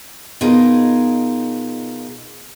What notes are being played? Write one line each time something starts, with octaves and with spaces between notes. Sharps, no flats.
B2 D#4 F4 G#4 A#4